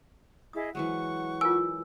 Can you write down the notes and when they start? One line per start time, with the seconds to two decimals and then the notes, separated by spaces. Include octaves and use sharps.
0.53 E4 G#4 D#5 D#6
0.75 E3 F#3 G#3 F#5 C#6
1.41 F4 A#4 G#5 E6